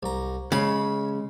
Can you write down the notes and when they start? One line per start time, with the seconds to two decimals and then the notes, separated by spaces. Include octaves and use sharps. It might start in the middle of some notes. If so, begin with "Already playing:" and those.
0.03 C2 A#5
0.52 C#3 G#3 C#5 B5